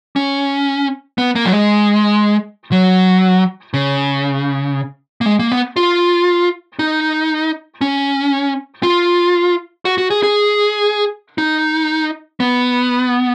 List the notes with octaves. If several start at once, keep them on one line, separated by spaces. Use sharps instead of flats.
C#4
B3
A#3
F#3
G#3
F#3
C#3
A#3
G#3
A#3
B3
F4
D#4
C#4
F4
F#4
F#4
G#4
G#4
D#4
B3